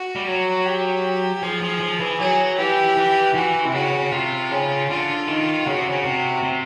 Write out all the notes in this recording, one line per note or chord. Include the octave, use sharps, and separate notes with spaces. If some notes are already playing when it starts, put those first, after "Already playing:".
Already playing: F#4
G3
F#3
G4
F3 G#4
F3
F3
E3
F#3 G#4
E3 G4
E3
E3 F#4
C3
C#3 F#4
C3 F4
C#3
D3 F4
D#3
C#3 F#4
C3
C#3
C3
C3